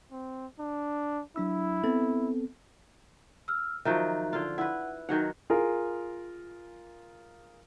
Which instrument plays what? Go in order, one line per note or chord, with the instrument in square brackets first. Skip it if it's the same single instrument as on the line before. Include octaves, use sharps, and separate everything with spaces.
[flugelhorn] C4
D4
[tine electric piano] F#3 D4 E6 [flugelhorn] E4
[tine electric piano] B3 C4 A4
[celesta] E6 F6
[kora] D#3 F3 F#3 [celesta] E5 A#5 F#6
[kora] D3 F4
[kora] E4 B4 [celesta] F#5
[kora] D#3 F#3 F#5 [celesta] D#4
[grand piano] F4 G#4 A#4